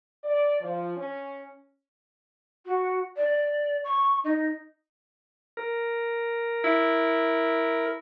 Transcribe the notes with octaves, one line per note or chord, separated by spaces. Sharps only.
D5
F3
C#4
F#4
D5
C#6
D#4
A#4
E4